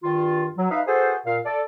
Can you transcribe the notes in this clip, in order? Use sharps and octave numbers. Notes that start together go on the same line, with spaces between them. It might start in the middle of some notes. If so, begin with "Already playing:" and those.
G2 D#3 F4
F#3
D#4 B4 E5 F5
F#4 G#4 A4 B4 C5
A#2 F5
A4 D5